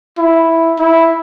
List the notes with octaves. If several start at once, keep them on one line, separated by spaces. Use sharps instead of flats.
E4
E4